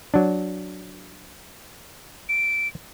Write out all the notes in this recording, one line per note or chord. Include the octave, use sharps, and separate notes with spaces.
F#3 D4
D7